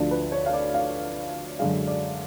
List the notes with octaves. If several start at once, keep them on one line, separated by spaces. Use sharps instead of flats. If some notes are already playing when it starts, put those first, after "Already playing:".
Already playing: D2 D3 F3 A3 D4
B4
C#5
F5
D5
F5
F#2 D3 G#3 F5
D5